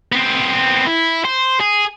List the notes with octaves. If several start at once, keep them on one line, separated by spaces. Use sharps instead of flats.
B3 C4
E4
C5
G#4